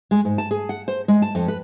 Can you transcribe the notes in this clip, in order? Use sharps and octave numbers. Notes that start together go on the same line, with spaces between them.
G#3
G#2
A5
G#4
F#5
C5
G#3
A5
F2
B4